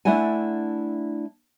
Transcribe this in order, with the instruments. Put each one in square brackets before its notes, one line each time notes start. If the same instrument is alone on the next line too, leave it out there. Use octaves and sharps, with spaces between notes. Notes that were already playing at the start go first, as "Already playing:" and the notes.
[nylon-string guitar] A3 D4 E4 D5 F#5 G#5